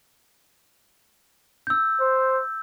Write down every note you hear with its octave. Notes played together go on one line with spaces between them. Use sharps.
E6 G6
C5